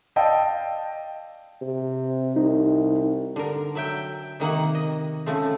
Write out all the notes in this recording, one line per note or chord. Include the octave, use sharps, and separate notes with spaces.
D5 D#5 F5 G5 A5 E6
C3
C2 D#4
D3 A#4
F#3 E5 G5
C3 D#3 A#3 F#5
D#5
C#3 F3 A3 C4